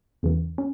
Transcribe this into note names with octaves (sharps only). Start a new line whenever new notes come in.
E2 C#3 E3
C#4